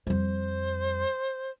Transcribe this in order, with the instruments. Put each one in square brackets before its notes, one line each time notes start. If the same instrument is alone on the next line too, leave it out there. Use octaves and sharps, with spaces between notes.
[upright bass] F2 G3 [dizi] C5